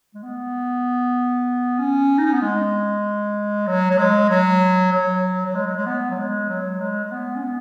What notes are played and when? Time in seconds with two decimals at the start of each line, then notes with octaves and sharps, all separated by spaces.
0.14 G#3
0.23 B3
1.79 C#4
2.18 D#4
2.26 C#4
2.33 B3
2.42 G#3
3.67 F#3
3.90 F#3
3.98 G#3
4.30 F#3
4.92 F#3
5.46 F#3
5.55 G#3
5.67 F#3
5.77 G#3
5.86 B3
6.11 F#3
6.17 G#3
6.49 F#3
6.80 G#3
7.04 G#3
7.11 B3
7.36 C#4
7.43 B3